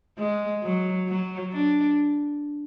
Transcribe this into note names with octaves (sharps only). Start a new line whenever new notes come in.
G#3
F#3
F#3
D4